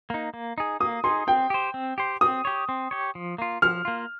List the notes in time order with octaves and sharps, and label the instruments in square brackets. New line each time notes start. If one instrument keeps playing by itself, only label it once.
[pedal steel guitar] A#3 D#4
A#3
D#4 G#4
[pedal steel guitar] A#3 [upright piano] D#6
[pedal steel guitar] D#4 G#4 [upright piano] C6
[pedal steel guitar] C4 [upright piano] G5
[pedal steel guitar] G4 C5
C4
G4 C5
[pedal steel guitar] C4 [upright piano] D#6
[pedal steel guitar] G4 C#5
C4
G4 C#5
F3
A#3 F4
[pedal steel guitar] F3 [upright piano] F6
[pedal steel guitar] A#3 F4